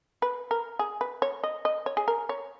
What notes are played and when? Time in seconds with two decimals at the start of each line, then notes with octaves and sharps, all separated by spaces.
0.22 B4
0.51 A#4
0.79 G#4
1.01 B4
1.22 C#5
1.44 D#5
1.65 D#5
1.86 C#5
1.97 G#4
2.08 A#4
2.29 C#5